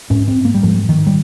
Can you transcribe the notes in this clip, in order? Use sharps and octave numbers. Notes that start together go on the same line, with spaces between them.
G#2 C#4
C4
A#3
G3
G#2 F3
D#3
G3